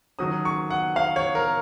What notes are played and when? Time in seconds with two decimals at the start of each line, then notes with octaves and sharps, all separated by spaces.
0.19 D#3 F#3 C#4 D#6
0.45 C#6
0.70 F#5
0.96 F5
1.16 C#5
1.35 A#4